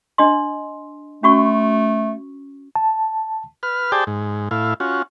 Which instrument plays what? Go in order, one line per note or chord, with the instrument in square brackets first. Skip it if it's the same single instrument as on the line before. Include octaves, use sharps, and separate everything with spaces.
[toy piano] D4 D#5 C6
[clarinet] A3 [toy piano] C#4 F#4 C#6
[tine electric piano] A5
[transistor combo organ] B4 F6
G4 G#4 C5 D5 G5 A5
G#2
A2 E4 F5
C#4 F4 F#4